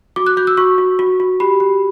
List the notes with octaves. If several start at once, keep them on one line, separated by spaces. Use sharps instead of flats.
F#4 D6
F#6
F#4 G6
E6
F#4 C#6
F#4
F#4
F#4
G4 B5
G4